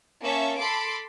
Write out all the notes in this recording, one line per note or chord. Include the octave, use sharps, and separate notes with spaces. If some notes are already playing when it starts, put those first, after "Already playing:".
A#3 C#4 E5 A5 C#6
A4 B5 C6 D6 D7